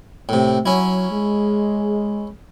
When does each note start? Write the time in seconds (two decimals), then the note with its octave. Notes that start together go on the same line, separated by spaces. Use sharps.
0.29 A2 C3
0.66 F#3 C#4 E4
1.11 G#3